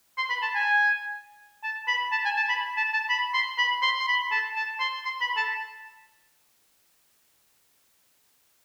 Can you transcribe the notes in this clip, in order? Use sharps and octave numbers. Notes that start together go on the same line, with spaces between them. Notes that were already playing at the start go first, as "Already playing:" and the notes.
C6
B5
A5
G#5
A5
B5
A5
G#5
A5
B5
A5
A5
B5
C6
B5
C6
C6
B5
A5
A5
C6
C6
B5
A5